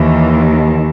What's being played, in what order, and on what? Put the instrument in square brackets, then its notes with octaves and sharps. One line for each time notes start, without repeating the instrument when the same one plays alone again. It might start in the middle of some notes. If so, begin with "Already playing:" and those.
Already playing: [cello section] D#2 D#3 E3